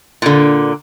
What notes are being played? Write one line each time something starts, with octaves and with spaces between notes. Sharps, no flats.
A#2 D3